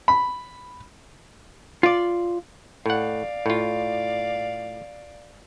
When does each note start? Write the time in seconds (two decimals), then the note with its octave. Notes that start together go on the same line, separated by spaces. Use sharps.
0.08 B5
1.83 F4 D5
2.86 A2 D5 F5 F#5
3.46 A2 F4